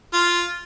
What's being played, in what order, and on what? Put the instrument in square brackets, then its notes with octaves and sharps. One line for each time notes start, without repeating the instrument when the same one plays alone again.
[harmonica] F4